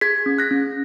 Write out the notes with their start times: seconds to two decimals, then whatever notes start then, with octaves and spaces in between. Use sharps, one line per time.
0.01 G#4 G#6 B6
0.26 C#4
0.38 F#6 A#6
0.51 C#4